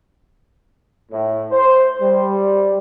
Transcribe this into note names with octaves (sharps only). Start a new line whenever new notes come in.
A2
C5
G3